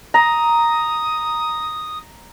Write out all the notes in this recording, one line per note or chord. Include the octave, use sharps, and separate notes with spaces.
A#5 D#6